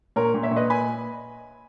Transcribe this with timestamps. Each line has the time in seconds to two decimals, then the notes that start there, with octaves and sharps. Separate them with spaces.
0.16 A#2 A#4 C#5
0.34 A#2
0.43 C#5 E5
0.51 A#2
0.56 B4 D#5
0.70 G#5 B5